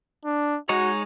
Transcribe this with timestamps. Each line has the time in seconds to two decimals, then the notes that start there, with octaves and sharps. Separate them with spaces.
0.25 D4
0.69 G#3 D#4 F#4 C#5